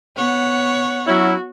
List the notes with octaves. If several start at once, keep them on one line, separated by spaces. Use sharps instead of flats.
B3 C#5 F#5
F#3 C#4 E4 F#4